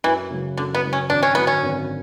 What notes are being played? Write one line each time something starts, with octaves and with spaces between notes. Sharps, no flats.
F#2 E3
C#3 F#3
F#2 D3
B3
C#3 F#3
C#4
G#1 D4
C#4
F#2 D3 F#3 B3
C#4
G#1